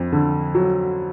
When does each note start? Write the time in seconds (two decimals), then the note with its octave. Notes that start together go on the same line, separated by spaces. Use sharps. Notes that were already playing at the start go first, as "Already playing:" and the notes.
Already playing: F2
0.12 D3
0.55 F#3